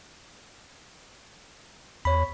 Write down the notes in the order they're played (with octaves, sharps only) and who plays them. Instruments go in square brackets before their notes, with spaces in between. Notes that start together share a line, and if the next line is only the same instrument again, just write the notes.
[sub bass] E2 [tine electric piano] C#5 B5